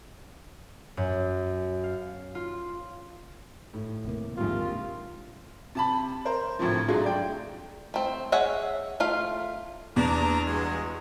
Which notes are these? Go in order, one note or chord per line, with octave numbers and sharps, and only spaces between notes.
F#2
F5
F4
A2
D#2 C3 A#3
A#1 D#2 C3 G#3 A#3 F4
C3 A5 B5
A#4 C5
D2 A2 C3 F3
G#2 D3 F#3 G#3 A3 F4
D5 G5
A3 C4
G#4 C#5 E5 F#5
A3 F4 F5
E2 D4 A#5
G2 G#3 F#4